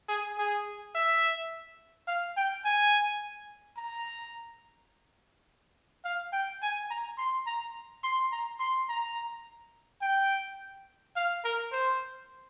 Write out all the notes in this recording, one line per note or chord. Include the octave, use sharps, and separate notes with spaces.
G#4
G#4
E5
F5
G5
G#5
A#5
F5
G5
G#5
A#5
C6
A#5
C6
A#5
C6
A#5
G5
F5
A#4
C5